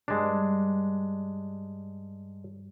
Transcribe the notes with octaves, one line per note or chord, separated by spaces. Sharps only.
G2 G#3 D4